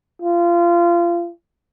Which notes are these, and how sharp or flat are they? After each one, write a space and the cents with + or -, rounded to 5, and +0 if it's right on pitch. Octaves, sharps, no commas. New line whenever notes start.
F4 -25